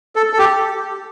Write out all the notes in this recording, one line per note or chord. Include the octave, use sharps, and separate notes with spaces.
A4
A4
G4